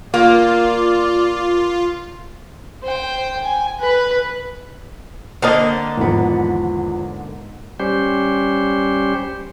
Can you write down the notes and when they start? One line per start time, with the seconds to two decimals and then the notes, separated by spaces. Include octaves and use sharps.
0.14 A#3 F4 D5
2.83 C5 G5
3.44 G#5
3.80 B4
5.42 D3 A#3 C4 A#4 D#5 A5
5.97 E2 G#2 D#3 F3 B3
7.79 G3 C#4 G4 C5